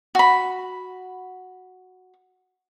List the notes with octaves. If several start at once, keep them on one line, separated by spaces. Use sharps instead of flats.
F#4 B5